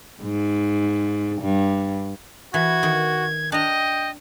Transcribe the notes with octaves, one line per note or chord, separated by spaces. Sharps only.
G#2
G2
E3 F#4 G#6
D#3
D4 D#5 G5 A#5